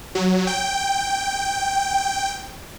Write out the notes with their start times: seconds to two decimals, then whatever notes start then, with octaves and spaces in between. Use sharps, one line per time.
0.15 F#3
0.47 G5